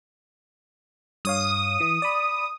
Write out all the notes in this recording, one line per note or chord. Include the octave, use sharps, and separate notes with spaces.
G2 C#5 F5 D#6
E3
D5 B5